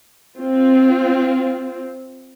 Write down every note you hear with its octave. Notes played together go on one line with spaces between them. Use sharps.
C4 F4